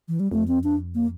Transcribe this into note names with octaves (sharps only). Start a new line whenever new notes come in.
E3
G3
F2 A3
C4
D4
A#3